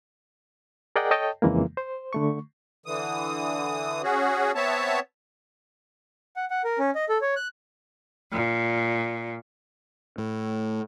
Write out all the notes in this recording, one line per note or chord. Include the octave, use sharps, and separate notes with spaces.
G#4 A#4 D5 D#5 F#5 G5
A4 C#5 D#5 G5 A5
F2 C#3 E3 G#3 A#3
C5
D3 A3 C#6
D3 E3 D#6
C#4 F#4 G#4
B3 C4 C#5 E5 A5
F#5
F#5
A#4
C#4
D#5
A4
C#5
F#6
A#2
A2